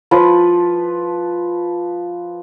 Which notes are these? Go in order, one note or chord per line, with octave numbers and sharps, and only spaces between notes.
F3 B4